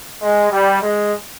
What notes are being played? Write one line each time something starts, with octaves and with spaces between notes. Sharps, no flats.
G#3
G3
G#3